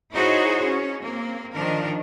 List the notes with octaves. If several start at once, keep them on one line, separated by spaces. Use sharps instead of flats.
D#4 E4 F#4 G#4 C5 C#5
C#4
A#3 C4
D#3 F3 D4 A#4